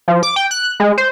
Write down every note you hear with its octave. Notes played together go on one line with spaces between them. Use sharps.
F3
D6
G5
F#6
G#3
C5